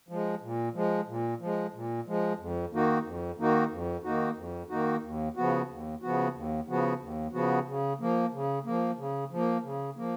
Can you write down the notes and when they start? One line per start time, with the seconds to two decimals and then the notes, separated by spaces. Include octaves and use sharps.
0.09 F3 G#3
0.42 A#2
0.74 F3 G#3
1.08 A#2
1.40 F3 G#3
1.74 A#2
2.07 F3 G#3
2.39 F2
2.73 D#3 A#3 D#4 F#4
3.05 F2
3.39 D#3 A#3 D#4 F#4
3.71 F2
4.03 D#3 A#3 D#4 F#4
4.36 F2
4.69 D#3 A#3 D#4 F#4
5.02 D#2
5.36 C#3 F3 B3 F#4
5.69 D#2
6.02 C#3 F3 B3 F#4
6.34 D#2
6.68 C#3 F3 B3 F#4
7.01 D#2
7.33 C#3 F3 B3 F#4
7.67 C#3
8.00 F3 A#3
8.33 C#3
8.65 F3 A#3
8.98 C#3
9.31 F3 A#3
9.64 C#3
9.97 F3 A#3